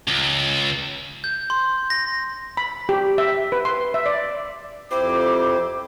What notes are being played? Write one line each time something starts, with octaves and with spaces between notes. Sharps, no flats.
C#2
G6
C6
A#6
B5
G4
E5
B4
C6
E5
D5
F2 C4 E4 G4 C5 D6